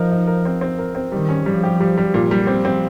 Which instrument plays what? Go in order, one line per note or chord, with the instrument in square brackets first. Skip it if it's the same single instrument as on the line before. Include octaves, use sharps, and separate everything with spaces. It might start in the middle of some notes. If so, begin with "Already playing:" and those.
Already playing: [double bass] F3 [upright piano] D#4 A#4
[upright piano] D#4
A#4
C4
C4
A#4
C4
[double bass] D#3 [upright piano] G3
[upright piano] C#4
[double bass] F3 [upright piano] G3
[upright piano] G4
G3
G3
A#2
G3
[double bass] F3 [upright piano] C4
[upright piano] C4